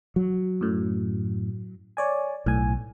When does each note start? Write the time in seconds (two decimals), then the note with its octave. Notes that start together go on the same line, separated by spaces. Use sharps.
0.16 F#3
0.61 F#2 A2
1.97 C#5 D5 G#5
2.46 B1 A2 G#5